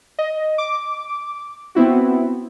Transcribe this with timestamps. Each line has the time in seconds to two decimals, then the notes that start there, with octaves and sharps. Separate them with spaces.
0.19 D#5
0.58 D6
1.75 B3 C4 E4 F#4